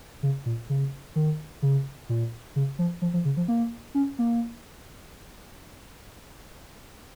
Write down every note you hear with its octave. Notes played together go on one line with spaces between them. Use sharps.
C#3
A#2
C#3
D#3
C#3
A#2
C#3
F3
F3
F3
C#3
F3
A#3
C#4
A#3